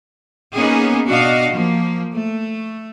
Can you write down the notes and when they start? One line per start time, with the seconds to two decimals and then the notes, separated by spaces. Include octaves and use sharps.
0.54 A#3 B3 C#4 D#4 G#4
1.08 B2 D4 F#4 D#5 F5
1.50 F3 A#3
2.13 A3